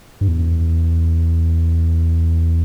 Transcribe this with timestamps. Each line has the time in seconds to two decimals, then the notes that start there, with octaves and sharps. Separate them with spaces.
0.21 G2
0.28 E2